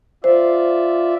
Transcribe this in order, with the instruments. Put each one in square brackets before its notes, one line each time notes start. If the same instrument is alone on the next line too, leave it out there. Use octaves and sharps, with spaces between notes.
[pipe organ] F4 D5 E5 [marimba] C5